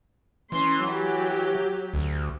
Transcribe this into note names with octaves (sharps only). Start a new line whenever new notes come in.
E3 C#4 C6
F#3 G4
D2